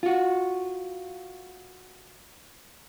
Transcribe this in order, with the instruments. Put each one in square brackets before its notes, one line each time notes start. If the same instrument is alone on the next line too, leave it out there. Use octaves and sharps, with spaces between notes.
[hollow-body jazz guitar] F4 F#4